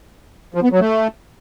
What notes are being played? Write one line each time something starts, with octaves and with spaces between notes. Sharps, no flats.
F3
B3
F#3
A3